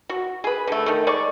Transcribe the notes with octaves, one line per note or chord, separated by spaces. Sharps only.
F#4
G#4 B4
D3 A3
D#3 A3
G#3 D5 C#6